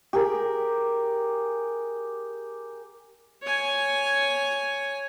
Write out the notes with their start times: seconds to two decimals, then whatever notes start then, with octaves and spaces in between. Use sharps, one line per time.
0.13 G4 G#4 A#4
3.42 C#5 G#5